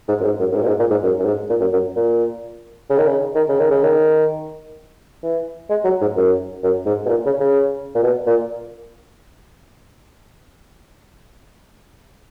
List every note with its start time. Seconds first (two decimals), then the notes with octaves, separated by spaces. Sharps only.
0.08 G#2
0.20 F#2
0.25 G#2
0.40 F#2
0.51 F#2
0.56 G#2
0.63 A#2
0.68 G#2
0.79 A#2
0.91 G#2
1.03 F#2
1.19 F#2
1.26 G#2
1.50 A#2
1.60 F#2
1.73 F#2
1.96 A#2
2.90 C#3
2.98 D#3
3.07 C#3
3.35 D#3
3.49 C#3
3.59 D#3
3.71 C#3
3.83 D#3
5.23 E3
5.70 G#3
5.84 F#3
6.01 G#2
6.17 F#2
6.64 F#2
6.86 G#2
7.06 B2
7.09 A#2
7.26 C#3
7.40 C#3
7.95 A#2
8.03 B2
8.27 A#2